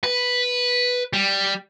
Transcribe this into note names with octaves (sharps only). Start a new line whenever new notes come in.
B4
G3